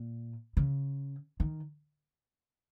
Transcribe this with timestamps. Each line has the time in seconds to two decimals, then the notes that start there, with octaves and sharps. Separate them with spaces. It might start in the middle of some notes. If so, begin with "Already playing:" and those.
Already playing: A#2
0.57 C#3
1.40 D#3